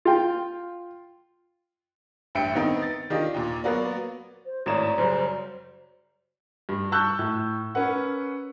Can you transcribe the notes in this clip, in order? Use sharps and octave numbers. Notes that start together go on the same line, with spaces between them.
F4 G5
A1 G2 E5 G5 C#7 D7
D#3 B3 C4 D#4
A6
D#3 D4 F4 G4 D#5
D#2 A#2
F#3 A#3 B3 F#4 A#4 D5
C5
G#1 A2 F#4 C#5 D5 A#5 E7
F#2 C#3 G3 C5
G2
A5 C#6 E6 F#6 G6
A2
C#4 A#4 B4 F#5